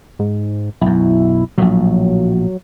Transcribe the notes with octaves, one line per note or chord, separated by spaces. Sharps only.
G#2
B1 F#2 E4
A#1 A2 F#3